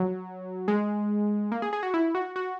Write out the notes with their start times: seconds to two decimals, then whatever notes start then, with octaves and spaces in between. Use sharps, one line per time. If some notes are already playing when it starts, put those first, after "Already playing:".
Already playing: F#3
0.68 G#3
1.52 A#3
1.62 G#4
1.73 G#4
1.83 F#4
1.94 E4
2.15 F#4
2.36 F#4